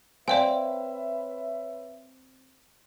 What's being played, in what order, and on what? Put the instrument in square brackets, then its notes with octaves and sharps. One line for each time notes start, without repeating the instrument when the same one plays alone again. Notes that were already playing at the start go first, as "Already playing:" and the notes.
[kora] C4 [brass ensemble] B4 C#5 E5 [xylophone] D5 F5 G#5